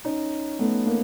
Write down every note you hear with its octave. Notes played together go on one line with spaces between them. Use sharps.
C#4 D#4
A3 B3
A#3